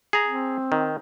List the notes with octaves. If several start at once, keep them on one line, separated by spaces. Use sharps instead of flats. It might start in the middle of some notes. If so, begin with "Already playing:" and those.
G#4 A#5
C4
D#3